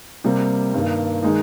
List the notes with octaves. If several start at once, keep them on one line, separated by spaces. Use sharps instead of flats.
C3 G3 A#3
G2 D#3 A#3
D#3 G#3 D#4